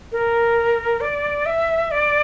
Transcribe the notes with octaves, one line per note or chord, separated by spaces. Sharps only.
A#4
D5
E5
D5